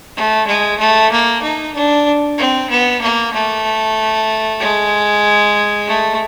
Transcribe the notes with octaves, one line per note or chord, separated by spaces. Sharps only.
A3
G#3
A3
A#3
D#4
D4
C4
B3
A#3
A3
G#3
A3